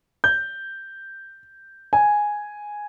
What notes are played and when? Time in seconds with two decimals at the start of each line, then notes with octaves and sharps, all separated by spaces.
0.24 G6
1.93 G#5